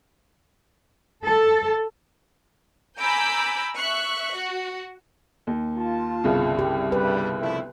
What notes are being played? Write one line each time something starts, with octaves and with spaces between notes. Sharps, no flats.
A4
G#5 A#5 B5 D6 E6 G6
E5 C#6 F#6
F#4
D#2
F4 A5
G1 C2 C#3
G4
G2 G3 B4
F3 A3 E4